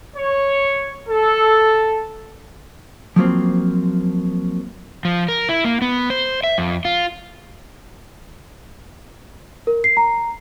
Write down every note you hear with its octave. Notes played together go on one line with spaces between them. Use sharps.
C#5
A4
F3 F#3 A#3 C4
F3
A#4
E4
A#3
B3
C5
E5
F2
F4
A#4
C7
A#5